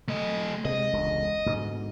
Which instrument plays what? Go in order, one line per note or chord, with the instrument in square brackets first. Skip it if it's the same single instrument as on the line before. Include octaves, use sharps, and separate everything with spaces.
[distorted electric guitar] A3 D#5
[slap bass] C3 G#3 [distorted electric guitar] D#5
[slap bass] E1 C#2 D3
G#2 B2 D3